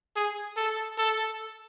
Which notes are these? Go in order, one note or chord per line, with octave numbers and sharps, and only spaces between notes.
G#4
A4
A4